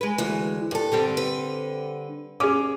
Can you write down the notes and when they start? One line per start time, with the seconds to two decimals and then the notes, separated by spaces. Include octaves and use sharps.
0.01 G#3 B4
0.18 D2 E3
0.71 G2 A4
0.92 D3 G3 C4
1.17 B4
2.40 C#4 G#4 D6